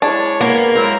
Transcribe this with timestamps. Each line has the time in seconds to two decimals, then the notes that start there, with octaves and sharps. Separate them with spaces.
0.02 G#3 D4 E4 C#5
0.41 A#3 B3
0.75 F#3 G#3 C4 E4 A#4